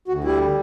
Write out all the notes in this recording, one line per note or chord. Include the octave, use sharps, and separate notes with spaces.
D2 F#4
G3 E4